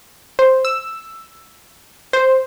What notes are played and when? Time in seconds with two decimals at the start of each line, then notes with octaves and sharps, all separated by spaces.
0.39 C5
0.65 E6
2.13 C5